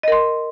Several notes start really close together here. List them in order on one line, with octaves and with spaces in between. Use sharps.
D#5 A#4 C6